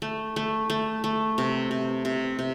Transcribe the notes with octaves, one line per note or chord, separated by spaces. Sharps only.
A3
A3
A3
A3
C3
C3
C3
C3